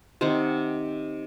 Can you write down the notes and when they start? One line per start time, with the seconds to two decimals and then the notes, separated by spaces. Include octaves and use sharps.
0.21 C3 D#3 C5 F#5